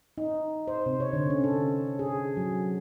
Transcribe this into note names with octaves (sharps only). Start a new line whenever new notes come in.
D#4
C5
C3
C#5
D3
C#4
A4
G#4
F#3